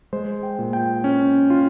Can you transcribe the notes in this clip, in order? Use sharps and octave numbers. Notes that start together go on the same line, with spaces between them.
G#3 C5
G5
A#2
G5
C#4
F4